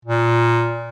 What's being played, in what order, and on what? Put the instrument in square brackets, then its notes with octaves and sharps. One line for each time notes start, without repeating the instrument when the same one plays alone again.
[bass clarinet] A#2